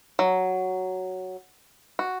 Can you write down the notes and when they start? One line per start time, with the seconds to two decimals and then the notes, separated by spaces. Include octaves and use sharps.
0.19 F#3
1.99 F#4